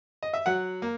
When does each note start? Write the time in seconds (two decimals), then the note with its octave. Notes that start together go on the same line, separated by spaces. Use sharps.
0.23 D#5
0.34 E5
0.46 F#3 F#5
0.82 A#3